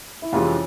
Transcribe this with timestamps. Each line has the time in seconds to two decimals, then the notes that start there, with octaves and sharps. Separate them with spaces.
0.22 E4
0.32 F2 C3 E3 G#3 C#4 F4